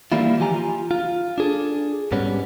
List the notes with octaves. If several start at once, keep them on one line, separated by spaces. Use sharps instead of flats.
D#3 E3 G3 A#3 E4 F4
E3 F3 G4 G#5 A#5
F4
F4
D4 G#4 A4
G#2 G3 B3 C#4